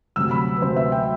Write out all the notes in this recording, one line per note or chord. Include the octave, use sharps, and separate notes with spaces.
D2 C3 F#3 E6
B5
B4
D2 C3 F#3 C5
E5
G5